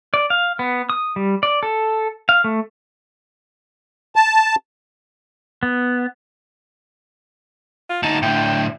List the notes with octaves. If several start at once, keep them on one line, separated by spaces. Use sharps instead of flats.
D5
F5
B3
D#6
G3
D5
A4
F5
A3
A5
B3
F4
D2 D#4 A5
A2 D3 G5